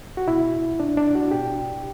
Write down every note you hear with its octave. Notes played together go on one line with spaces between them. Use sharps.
F#4
B2 E4
D4
D4
F#4
B2 G4